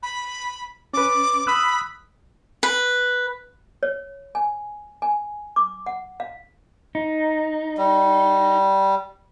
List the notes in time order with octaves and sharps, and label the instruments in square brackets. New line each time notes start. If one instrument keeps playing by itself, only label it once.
[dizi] B5
[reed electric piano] C#4 B4 [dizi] D6
[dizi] B5 [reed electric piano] D#6 E6 F#6
[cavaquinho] B4
[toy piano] C#5
G#5
G#5
D6
F#5
F5
[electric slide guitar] D#4
[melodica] G3